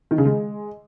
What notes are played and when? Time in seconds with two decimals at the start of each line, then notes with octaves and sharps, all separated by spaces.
0.11 D#3
0.18 C#3
0.25 G#3